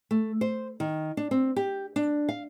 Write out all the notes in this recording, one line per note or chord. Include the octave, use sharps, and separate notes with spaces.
A3
C5
D#3
D4
C4
G4
D4
F5